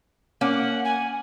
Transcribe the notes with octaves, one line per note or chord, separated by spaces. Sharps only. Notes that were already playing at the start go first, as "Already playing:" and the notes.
A#3 C#4 F#5
G#5